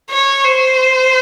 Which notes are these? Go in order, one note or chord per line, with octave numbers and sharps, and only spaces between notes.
C#5
C5